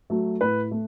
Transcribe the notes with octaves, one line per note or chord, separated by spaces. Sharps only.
F#3 A3
A2 B4
A3